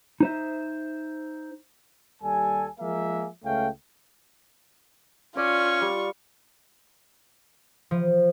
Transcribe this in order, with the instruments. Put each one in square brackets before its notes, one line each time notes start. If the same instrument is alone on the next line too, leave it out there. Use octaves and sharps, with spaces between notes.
[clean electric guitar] D#4 C5 E5
[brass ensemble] D#2 G3 A4 G#5
F3 G#3 A#3 G#4 A#4 E5
C#2 A3 C#4 F5 G5
[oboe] C#4 [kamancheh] F4 C#6 [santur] D5
[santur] G3
[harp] F3